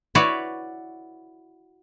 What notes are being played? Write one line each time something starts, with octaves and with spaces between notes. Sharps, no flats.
E4 F#4 B4 C#5 D5